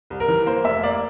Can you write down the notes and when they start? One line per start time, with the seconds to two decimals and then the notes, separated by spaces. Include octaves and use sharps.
0.10 C2
0.20 A#4
0.28 E3
0.46 A#3 C5
0.64 F1 E5
0.83 A#3 D5